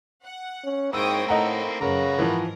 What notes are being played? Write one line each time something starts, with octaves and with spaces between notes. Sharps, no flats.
F#5
C#4
G#2 A#3 C4 E4 C#5 G5 D#6 E6
A2 A3 D#4 A4 D#5 F#5 A#5
F#2 C#3 F#3 F#4 A#4 B4 A#5
G#2 E3 F3 A#4